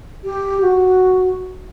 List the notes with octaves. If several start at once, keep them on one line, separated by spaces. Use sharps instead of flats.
G4
F#4